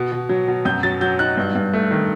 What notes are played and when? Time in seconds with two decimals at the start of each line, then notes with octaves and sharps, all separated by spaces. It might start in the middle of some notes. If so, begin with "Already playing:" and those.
Already playing: B2
0.12 B2
0.29 F#3
0.48 B2
0.65 F#2 G6
0.83 F#3 A6
1.01 F#3 G6
1.19 D#4 F#6
1.37 G2
1.55 G2
1.73 A3
1.91 D#3